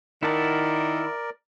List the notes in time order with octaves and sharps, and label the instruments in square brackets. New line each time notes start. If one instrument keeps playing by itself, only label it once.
[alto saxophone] D#3 [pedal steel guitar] E4 F#5 A5 [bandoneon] A#4 D5